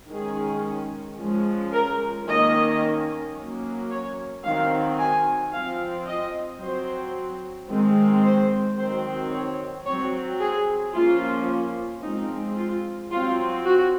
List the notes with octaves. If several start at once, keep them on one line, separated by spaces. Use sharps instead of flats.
D#3 G#3 C#4 G#4
F3 G#3 C#4
A#4
D#3 A#3 C#4 D#5
F#3 A#3 C#4
C#5
D#3 F#3 C4 F5
G#5
F3 C4 F5
D#5
F#3 C4 C5
D#3 G#3 C4
C5
D#3 F#3 C4 C5
C#5
F#3 C4 C#5
G#4
F3 A#3 C#4 F4
F3 G#3 C4 D#4
F4
F#3 C4 F4
F#4